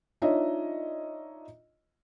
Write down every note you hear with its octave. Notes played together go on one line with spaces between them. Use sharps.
D4 D#4 F4 C#5 D#5 E5